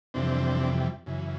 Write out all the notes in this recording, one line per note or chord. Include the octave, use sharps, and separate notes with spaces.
F2 C3 E3 G3 C4 D4
F#2 C#3 E3